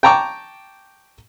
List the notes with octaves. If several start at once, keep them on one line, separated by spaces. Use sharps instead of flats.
G5 A5 A#5 C#6 D6